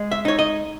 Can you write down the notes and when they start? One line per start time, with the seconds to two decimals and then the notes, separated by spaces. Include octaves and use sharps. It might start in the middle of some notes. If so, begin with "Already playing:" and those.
Already playing: G#3
0.11 E5
0.25 D#4 C#5
0.39 D#5